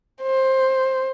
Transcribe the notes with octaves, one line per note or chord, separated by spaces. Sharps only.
C5